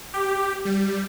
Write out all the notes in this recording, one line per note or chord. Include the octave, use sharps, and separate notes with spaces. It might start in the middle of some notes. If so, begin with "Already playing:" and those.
G4
G3